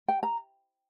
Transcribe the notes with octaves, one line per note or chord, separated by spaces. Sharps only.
G5
A#5